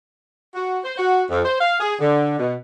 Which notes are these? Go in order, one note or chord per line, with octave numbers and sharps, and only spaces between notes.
F#4
C5
F#4
F2
C5
F5
G#4
D3
B2